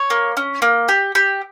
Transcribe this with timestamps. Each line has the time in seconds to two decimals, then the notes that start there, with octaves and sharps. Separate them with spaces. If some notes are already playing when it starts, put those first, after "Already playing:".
Already playing: C#5
0.10 A#3
0.37 C#4
0.62 A#3
0.89 G4
1.15 G4